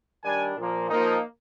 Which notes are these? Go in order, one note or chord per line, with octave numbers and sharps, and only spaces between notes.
D#3 G3 D4 G#5
A#2 F3 A#3
F3 A#3 D#4